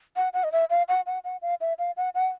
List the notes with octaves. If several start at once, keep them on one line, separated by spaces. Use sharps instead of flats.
F#5
F#5
D#5
E5
F5
F#5
F#5
F#5
F5
E5
F5
F#5
F#5